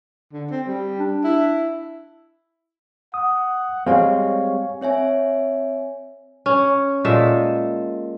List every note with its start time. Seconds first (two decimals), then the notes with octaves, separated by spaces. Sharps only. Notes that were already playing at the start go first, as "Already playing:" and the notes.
0.33 D3
0.51 C4
0.68 G3
0.99 D4
1.24 E4
3.14 F#5 D#6
3.87 G3 G#3 C4 C#5 F5 G#5
4.81 C4 C#5 E5 G#5
6.46 C#4
7.05 A#2 G#3 A4 E5